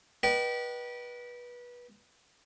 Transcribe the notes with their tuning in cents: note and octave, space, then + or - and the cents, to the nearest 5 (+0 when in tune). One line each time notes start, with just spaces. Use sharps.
B4 -25 D#5 -40 G5 -30